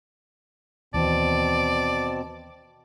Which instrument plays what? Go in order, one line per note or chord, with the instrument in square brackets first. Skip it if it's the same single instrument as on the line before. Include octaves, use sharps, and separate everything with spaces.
[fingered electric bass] D#2 E3 [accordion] B2 C4 A5 [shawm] D5